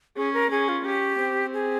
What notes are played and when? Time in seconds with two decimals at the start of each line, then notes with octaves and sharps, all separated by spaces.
0.16 C#4 G#4
0.34 A#4
0.51 C#4 G#4
0.69 F4
0.85 C#4 G4
1.20 C4
1.54 G#4